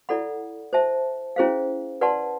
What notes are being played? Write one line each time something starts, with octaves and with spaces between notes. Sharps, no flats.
E4 A4 D5 F#5 B5
C5 E5 A5
C#4 E4 G#4 C5 F5
B4 D5 F#5 A5 C6